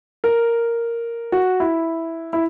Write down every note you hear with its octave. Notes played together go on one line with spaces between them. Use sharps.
A#4
F#4
E4
E4